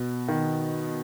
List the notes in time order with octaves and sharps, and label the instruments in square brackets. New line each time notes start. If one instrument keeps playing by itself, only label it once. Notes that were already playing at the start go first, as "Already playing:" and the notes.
Already playing: [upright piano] B2
D#3